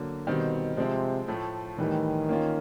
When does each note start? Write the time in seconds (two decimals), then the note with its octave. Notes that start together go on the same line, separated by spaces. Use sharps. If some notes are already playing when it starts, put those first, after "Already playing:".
Already playing: D3 F#3 A#3
0.27 B2 D#3 G3 C4
0.77 C3 F3 G#3 C4
1.28 A2 F3 A3
1.78 A2 D#3 E3 G3
2.29 A#3 C#4 F4